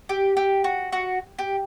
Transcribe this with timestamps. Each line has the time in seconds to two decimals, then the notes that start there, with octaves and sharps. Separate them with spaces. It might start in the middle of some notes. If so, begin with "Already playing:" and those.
0.09 G4
0.37 G4
0.64 F#4
0.92 F#4
1.39 G4